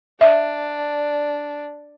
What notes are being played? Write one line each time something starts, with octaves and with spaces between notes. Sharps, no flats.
D4 E5